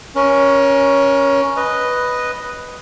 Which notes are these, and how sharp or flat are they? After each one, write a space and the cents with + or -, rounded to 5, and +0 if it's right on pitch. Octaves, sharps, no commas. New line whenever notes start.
C#4 +5 A#4 +30
B4 +0 D#5 +0